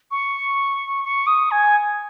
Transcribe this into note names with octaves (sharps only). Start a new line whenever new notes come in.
C#6
C#6
D#6
G#5